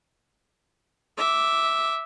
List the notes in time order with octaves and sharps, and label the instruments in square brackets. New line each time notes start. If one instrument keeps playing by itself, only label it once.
[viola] E5 D6